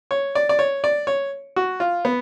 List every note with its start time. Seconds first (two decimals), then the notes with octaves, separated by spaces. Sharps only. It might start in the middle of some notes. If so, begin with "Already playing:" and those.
0.11 C#5
0.35 D5
0.49 D5
0.59 C#5
0.84 D5
1.07 C#5
1.56 F#4
1.80 F4
2.05 B3